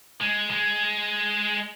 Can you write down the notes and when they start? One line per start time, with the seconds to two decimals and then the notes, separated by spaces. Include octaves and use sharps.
0.21 G#3
0.51 G#3